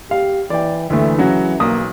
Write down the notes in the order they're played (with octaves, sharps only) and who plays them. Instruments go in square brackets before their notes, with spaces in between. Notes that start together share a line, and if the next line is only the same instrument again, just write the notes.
[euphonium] G4 [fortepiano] F5
[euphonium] E3 [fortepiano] D5 G5
[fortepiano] D2 A3 [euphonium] E3
[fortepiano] C#3 [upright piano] F#3 F#4
[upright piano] B1 [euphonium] A#3 [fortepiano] D#6